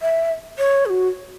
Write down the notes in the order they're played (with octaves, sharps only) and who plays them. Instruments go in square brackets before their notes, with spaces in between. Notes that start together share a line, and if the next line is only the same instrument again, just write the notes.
[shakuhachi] E5
C#5
G#4
F#4